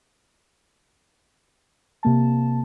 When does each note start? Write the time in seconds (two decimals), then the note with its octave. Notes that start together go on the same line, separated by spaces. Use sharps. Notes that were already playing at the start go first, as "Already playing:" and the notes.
2.03 C3 A#3 A5